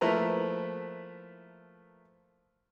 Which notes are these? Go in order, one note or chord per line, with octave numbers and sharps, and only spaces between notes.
F3 A3 A#3 E4 B4 A#5